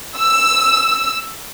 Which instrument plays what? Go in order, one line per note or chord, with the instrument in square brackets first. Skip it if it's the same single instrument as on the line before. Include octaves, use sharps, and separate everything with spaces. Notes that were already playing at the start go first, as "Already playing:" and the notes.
[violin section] E6